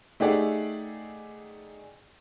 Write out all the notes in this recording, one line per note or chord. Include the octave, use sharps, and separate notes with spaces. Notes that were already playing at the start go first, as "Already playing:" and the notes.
A3 D#4 G4 G#4 D5 F#5